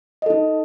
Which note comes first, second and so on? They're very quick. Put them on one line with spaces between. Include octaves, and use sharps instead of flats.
D#5 A4 D#4